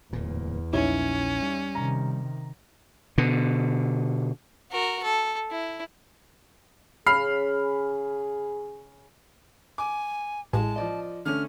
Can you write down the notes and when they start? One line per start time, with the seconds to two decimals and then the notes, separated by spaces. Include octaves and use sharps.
0.13 D1 E2 A#2
0.73 A#1 C#4 D#4 E4 C#5
1.42 G3
1.75 C3 D#3 A#5
3.18 B2 D3
4.71 F#4 A#4
5.03 A4
5.51 E4
7.06 C#3 G#4 B5 F6 C7
9.78 G#5 D6
10.53 A1 G#3 A5
10.76 F3 D5 D#5
11.25 D3 A3 C#4 F6